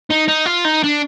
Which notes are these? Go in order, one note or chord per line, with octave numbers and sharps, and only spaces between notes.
D#4
D#4
F4
D#4
D4